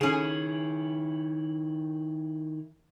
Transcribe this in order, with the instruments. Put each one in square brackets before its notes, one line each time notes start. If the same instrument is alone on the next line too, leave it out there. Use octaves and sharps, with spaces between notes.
[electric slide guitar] D#3 E4 [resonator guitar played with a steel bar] C#4 G#4